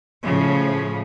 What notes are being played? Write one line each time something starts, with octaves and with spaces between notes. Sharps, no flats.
A2 C#3 F3